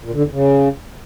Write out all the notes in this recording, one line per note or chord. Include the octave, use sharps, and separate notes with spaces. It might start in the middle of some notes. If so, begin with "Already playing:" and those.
A#2
D3
E2
C#3